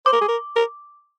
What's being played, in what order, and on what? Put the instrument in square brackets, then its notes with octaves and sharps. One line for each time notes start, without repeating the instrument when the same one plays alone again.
[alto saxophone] C5 [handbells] D6
[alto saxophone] A#4
G#4
A#4
A#4